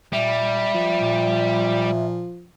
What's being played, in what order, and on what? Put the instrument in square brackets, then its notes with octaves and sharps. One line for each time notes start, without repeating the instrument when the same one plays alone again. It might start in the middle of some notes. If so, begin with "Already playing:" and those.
[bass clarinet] A#2 [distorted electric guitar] G3 [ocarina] E5
[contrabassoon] F3
[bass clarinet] A#2